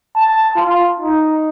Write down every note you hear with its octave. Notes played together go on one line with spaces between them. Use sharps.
A5
F4
D#4